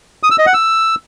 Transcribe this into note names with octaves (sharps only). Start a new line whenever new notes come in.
D#6
E6
D#5
F#5
E6